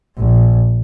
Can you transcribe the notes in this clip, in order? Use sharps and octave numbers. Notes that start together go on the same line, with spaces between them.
A#1